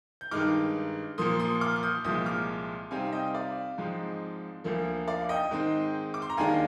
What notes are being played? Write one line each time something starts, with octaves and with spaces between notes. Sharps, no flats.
G6
G2 D#3 G#3 D#4 D6 F6
A#2 F3 A#3 C6 D#6
C6 D#6
D6 F6
F6
D#6 G6
C2 A#2 F3 G#3 D#6 G6
D6 F6
C3 G3 C4 D#4 F5 G#5
F5
D#5 G5
D5 F5
G#2 F3 G#3 C4 D#4
D2 D3 F3 A#3
D5 F5
D#5 G5
G#2 D#3 G#3 C4
D6
C6
A#5
D#2 D#3 G#3 D4 F5 G#5